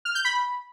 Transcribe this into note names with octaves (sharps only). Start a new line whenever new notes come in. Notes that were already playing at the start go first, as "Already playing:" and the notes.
F6
G6
B5